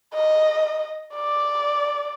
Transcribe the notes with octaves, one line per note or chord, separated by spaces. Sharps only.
D#5
D5